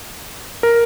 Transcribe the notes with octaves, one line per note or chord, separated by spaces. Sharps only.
A#4